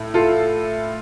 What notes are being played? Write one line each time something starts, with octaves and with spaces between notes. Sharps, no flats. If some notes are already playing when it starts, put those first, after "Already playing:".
Already playing: A2
F4 A4